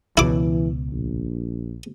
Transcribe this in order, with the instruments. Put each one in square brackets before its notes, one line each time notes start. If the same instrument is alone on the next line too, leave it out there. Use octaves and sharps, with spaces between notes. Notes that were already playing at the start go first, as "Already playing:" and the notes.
[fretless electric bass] C#2 B2 [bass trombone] E3 [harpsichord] E4 D6
[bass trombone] A#1